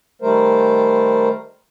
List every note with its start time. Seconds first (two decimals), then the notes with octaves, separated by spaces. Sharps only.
0.22 D#3 G3 A3 A#4 C5